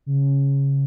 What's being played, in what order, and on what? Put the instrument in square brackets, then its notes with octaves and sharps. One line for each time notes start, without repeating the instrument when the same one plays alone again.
[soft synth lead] C#3